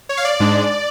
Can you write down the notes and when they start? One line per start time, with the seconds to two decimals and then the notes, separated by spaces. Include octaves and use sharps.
0.09 C#5
0.17 F5
0.25 D5
0.40 G#2 G#3 D4